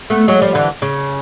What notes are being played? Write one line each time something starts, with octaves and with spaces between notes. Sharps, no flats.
A3 B3
F#3 G#3
F3 G3
D3 E3
C#3